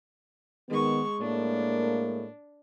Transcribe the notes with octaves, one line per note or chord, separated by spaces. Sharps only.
D#3 G#3 B3 C#6
A2 G#3 A#3 D4